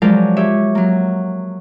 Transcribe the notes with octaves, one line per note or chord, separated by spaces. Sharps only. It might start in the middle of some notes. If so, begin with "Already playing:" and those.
F3 F#3 G#3 A#4 D5 F5
G4 C#5 E5
F#3 A#3